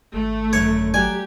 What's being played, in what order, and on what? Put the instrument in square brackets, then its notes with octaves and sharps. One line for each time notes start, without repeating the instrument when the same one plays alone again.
[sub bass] G#1 [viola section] A3
[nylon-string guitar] F#2 D3 [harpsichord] C#5
[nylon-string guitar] F#3 D5 [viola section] G4 [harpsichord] G#5